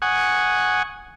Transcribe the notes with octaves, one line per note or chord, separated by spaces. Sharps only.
F#5 G#5 C#6 D#6